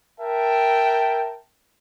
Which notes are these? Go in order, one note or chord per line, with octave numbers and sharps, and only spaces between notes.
A#4 E5 G5 A5